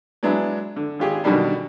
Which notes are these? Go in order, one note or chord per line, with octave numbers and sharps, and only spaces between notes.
F#3 G#3 B3 D4 E4
D3
G#1 F4 G4 G#4
F#2 B2 D3 D#3 G3 D4